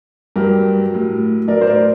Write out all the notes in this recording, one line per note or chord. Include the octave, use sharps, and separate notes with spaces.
G2 F#3 G4 A#4
A2 F#3
A2 F#3 A#4 D5
C5
A#4 D5